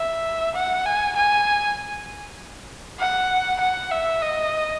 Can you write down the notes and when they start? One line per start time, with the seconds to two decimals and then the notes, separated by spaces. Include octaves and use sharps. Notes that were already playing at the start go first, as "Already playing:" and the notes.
Already playing: E5
0.55 F#5
0.85 G#5
1.16 G#5
2.99 F#5
3.60 F#5
3.91 E5
4.21 D#5